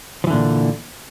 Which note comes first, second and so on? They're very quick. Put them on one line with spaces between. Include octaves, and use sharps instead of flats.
F3 E3 D3 A#2